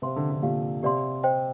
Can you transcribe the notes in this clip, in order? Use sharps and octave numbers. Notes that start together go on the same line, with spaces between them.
C3 C5 F5 C6
D3
D3
A#2 G4 D5 F5
C3 G4 D5 F5 C6
C5 D#5 G5